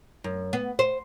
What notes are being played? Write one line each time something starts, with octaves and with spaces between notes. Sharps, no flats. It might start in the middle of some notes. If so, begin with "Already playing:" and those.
F#2
B3
C5